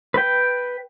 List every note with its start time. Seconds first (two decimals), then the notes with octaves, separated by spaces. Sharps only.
0.14 B4 G5